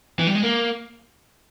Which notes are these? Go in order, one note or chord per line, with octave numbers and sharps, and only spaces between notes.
E3
G3
G#3
A#3